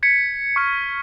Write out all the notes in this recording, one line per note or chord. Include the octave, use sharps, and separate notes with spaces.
G#6 B6 C#7
C#6 F6 C#7